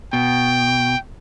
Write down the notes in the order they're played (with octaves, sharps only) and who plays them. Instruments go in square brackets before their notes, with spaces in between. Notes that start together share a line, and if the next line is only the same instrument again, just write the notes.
[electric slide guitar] B2 [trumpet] G5